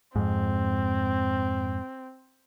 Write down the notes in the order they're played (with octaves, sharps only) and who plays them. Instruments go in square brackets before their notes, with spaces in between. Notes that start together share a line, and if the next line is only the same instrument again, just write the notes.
[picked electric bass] F2 G#2 [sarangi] C4